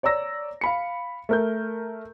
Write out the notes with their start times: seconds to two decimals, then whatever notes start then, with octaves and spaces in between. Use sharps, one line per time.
0.03 C#5 D5 A#5 E6 A#6
0.61 F5 B5 C#7
1.29 A3 A#4 G6